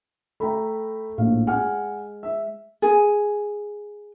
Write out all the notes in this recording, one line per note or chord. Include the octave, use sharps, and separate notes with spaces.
A3 G5 A#5 B5
A#1 A2 F5
G#3 F#5 G#5 F6
E5
G#4